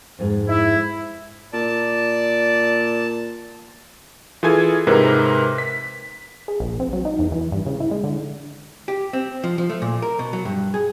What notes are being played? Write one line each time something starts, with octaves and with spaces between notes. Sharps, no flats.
F2 G#2 G#4
E4
A#2 D5 A5
E3 F4 G#4 A4 G#5 G#6
G#2 C3 A#4 B4
B6
G#4
A#1
C4
F#3
D#4
E2
E3
G2
C#3
E4
G#3
D3
G4
C4
F3
F3
A3
A#2
A#4
B2
F#3
G2
G#4